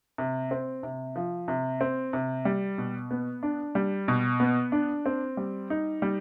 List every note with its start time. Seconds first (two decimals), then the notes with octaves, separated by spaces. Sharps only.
0.18 C3
0.51 C4
0.83 C3
1.16 F3
1.48 C3
1.81 C4
2.13 C3
2.45 G3
2.78 B2
3.11 B3
3.43 D4
3.75 G3
4.08 B2
4.40 B3
4.72 D4
5.06 C4
5.37 G3
5.70 D#4
6.02 G3